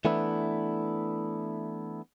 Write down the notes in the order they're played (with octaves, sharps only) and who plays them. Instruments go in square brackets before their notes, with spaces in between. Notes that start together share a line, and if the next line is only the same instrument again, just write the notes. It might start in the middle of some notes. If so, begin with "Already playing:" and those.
[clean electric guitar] E3 A3 B3 D4 E4